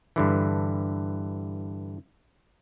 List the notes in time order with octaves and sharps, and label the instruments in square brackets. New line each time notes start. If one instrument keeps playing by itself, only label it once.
[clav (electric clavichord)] G2 D3 E3